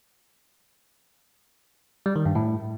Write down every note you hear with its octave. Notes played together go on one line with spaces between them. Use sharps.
G3
D#3
G2
A2